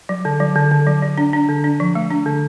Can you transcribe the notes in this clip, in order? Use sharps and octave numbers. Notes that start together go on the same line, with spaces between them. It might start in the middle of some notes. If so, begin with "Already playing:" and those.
F#3
D3
F#3
D3
D3
F#3
F#3
D4
D4
D3
D4
F3
A3
D4
D3